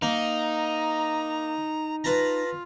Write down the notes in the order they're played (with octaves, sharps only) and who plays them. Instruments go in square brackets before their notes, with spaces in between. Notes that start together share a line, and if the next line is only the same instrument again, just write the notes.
[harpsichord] A#3 [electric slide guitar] D#4 [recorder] A#5
[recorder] F4 [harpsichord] B4 A5 A#5